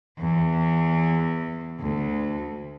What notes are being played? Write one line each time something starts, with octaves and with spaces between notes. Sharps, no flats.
E2
D2